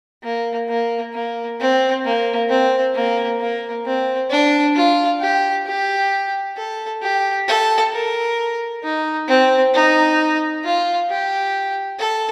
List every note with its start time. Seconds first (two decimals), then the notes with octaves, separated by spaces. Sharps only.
0.23 A#3
0.69 A#3
1.14 A#3
1.60 C4
2.05 A#3
2.49 C4
2.95 A#3
3.40 A#3
3.86 C4
4.30 D4
4.76 F4
5.21 G4
5.67 G4
6.57 A4
7.02 G4
7.48 A4
7.92 A#4
8.84 D#4
9.28 C4
9.74 D#4
10.64 F4
11.09 G4
12.00 A4